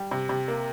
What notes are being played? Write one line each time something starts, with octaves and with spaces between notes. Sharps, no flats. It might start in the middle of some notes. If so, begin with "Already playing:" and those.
Already playing: G3
C3
C3
A#3